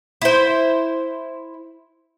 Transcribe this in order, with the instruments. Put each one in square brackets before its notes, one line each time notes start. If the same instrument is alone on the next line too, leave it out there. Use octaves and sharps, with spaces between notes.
[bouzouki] E4 C5